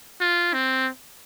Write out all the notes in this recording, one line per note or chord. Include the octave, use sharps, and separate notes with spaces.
F4
C4